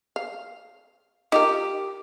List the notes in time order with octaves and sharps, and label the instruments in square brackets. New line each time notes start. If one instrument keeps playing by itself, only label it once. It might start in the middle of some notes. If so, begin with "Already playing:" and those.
[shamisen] F5
[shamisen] D#4 F4 A#4 [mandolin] G4